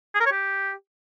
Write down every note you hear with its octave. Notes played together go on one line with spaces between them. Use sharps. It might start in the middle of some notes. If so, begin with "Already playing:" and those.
G#4
A#4
C#5
G4